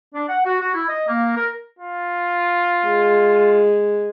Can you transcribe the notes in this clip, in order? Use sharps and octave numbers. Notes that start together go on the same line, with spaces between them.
D4
F#5
F#4
F#4
E4
D#5
A#3
A#4
F4
G#3